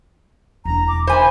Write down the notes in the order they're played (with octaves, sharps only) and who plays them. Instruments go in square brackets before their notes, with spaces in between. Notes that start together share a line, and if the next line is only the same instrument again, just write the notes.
[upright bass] E1 D4 [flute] A#5
[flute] D6
[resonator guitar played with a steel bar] C5 G#5 [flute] B5